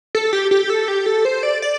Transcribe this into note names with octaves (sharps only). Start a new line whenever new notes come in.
A4
G4
G4
A4
G4
A4
C5
D5
D5